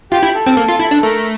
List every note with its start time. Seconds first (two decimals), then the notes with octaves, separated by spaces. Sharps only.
0.12 F4 G4
0.23 E4
0.34 A4
0.46 C4
0.57 A#3
0.69 F4
0.80 E4
0.91 D4
1.03 A3 A#4